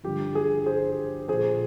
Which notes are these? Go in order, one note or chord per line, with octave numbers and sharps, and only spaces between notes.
G2 D3 F3 G4
G#4
G#4 C5
A#2 F3 G#4 C5